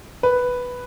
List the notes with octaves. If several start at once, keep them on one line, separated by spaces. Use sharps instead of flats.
B4